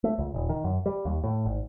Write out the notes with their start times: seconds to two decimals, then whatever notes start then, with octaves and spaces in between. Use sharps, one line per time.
0.04 A3
0.18 C#2
0.34 D#1
0.49 D#3
0.64 F#2
0.86 G3
1.05 D#2
1.24 A2
1.45 G#1